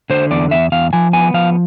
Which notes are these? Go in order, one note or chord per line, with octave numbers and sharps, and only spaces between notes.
D3 C5
E2 D5
E2 E5
E2 F5
F3 G#5
B3 G#5
F3 F5